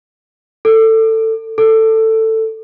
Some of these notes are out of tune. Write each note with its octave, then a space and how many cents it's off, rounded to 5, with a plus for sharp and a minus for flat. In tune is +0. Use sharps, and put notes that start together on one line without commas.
A4 +20
A4 +15